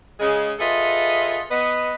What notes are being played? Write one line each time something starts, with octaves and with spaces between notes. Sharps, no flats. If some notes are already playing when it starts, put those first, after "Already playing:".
C#3 G#3 G#4
F4 G#4 A4 B4 D#5 E5
B3 B4 D#5